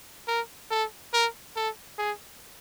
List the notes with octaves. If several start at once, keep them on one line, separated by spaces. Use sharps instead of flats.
A#4
A4
A#4
A4
G#4